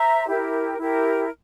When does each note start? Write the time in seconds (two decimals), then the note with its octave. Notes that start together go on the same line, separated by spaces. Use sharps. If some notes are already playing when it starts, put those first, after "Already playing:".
Already playing: C5 E5 A#5
0.27 E4 G4 A#4
0.78 E4 G4 A#4